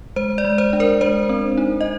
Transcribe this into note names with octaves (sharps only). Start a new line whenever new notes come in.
G#3 C5
D5
G#3
C5
D4
A#4
G#3 C5
C4
D#4
D#5